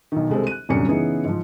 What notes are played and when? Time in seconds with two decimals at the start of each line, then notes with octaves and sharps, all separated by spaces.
0.12 B1 D#3
0.30 C2 G#3 G4 A4 C5
0.47 F#6 D#7
0.69 D#1 C2 F#2 D3 G3 C#7
0.89 C#3 E3 B3 C#4 D#4 G#4
1.24 G#2 F3